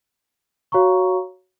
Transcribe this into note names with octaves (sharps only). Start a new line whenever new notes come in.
F#4 C#5 F5 A#5 C#6